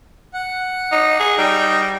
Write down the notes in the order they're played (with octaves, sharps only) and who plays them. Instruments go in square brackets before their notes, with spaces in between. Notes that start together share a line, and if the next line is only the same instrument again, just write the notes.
[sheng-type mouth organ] F#5
[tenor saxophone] D#4
G#4
[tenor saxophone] G3 [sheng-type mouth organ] D#4 G5 A#5